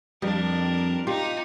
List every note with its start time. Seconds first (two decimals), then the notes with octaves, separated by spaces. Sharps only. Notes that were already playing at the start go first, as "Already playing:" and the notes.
0.22 F2 G3 D4 A#4
1.07 D#4 F4 G4